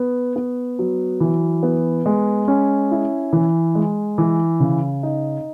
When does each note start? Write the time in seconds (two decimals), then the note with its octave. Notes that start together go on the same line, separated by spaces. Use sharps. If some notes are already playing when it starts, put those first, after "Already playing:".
Already playing: B3
0.36 B3
0.79 F#3
1.20 E3
1.63 B3
2.06 G#3
2.48 C#4
2.91 E4
3.33 E3
3.75 G#3
4.18 E3
4.60 C#3
5.03 D#4